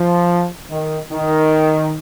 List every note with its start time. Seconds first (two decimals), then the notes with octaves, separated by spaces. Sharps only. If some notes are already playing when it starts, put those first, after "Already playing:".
Already playing: F3
0.70 D#3
1.11 D#3